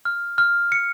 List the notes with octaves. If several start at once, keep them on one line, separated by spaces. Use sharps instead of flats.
F6
F6
C#7